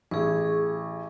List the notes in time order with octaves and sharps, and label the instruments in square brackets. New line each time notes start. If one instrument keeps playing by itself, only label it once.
[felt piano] A1 [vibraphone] G#4 C#6